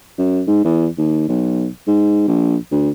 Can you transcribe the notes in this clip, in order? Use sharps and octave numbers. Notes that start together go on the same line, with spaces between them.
F#2
G#2
E2
D#2
B1
G#2
A#1
D2